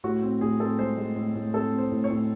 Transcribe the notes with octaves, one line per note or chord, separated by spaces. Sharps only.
A2 F#4
C4
A2 G#4
C4 A4
G#3 C5
G#3
A2
A2
C4 A4
C4
C5
A2
C#5
A2